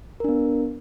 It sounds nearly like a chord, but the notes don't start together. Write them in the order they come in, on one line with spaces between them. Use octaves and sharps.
A#4 D4 B3